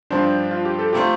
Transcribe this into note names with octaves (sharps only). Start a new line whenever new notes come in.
G2 F3 C4 D4 G4 C5
F4
G4
A4
C3 A3 F4 G4 C5